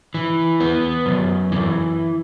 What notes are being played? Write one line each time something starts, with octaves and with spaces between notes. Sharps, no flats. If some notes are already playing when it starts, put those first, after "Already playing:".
E3
B3
F#2
E3